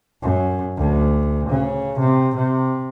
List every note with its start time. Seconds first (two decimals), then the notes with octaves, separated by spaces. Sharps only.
0.22 F#2
0.77 D2
1.50 C#3
1.99 C3
2.36 C3